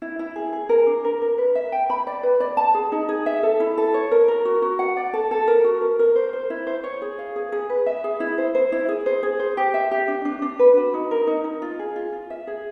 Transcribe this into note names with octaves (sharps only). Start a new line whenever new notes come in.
E4
E4
G#4
G#4
A#4
D4
A#4
A#4
B4
E5
G5
B5
D5
B4
D5
A5
G#4
D#4
G#4
E5
A4
E4
A4
C#5
A#4
A#4
F#4
F#4
F#5
D5
A4
A4
A#4
F#4
A#4
A#4
C5
C5
E4
C5
C#5
G#4
F5
G#4
G#4
B4
E5
G#4
E4
C5
C5
E4
G#4
C5
G#4
C5
G4
E5
G4
D4
D4
D4
B4
F#4
D#4
A#4
D#4
D#4
F4
G#4
F4
F4
E5
G#4